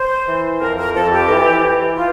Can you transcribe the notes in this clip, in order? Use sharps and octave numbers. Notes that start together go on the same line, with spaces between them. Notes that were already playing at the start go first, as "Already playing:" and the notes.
Already playing: C5
E3
F2 A#4
A#4
F2 A4
G4
E3
E3
F4